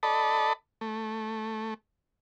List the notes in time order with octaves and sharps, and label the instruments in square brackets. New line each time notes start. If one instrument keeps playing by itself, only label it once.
[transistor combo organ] A4 D5 D#5 A5 B5
A3